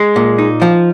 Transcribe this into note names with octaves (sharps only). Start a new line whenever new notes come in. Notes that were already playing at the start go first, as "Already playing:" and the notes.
Already playing: G#3
A#2
D#4
F3